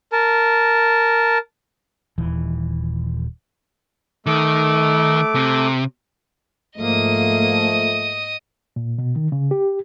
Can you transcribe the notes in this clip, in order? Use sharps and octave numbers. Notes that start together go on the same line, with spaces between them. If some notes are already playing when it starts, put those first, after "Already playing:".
A#4 A5
D#1 E3
D#3 A3 D6
C3
G#2 F3 A3 A#3 D#5 D#6
A#2
B2
D#3
C#3
G4